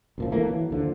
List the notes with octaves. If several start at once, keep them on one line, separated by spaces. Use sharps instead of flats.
C#2 A#2 F3
D#3 E3 A3 A#3
E3 F#3
D#2 D3 F3